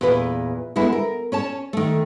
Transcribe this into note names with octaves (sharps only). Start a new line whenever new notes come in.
E2 A#2 B4
D3 G#3 B3 E4
A#4
C#4 C#5 A5
D#3 A3